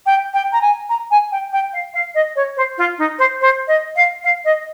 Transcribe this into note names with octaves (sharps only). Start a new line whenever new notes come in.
G5
G5
A#5
G#5
A#5
G#5
G5
G5
F5
F5
D#5
C#5
C5
F4
D#4
C5
C5
D#5
F5
F5
D#5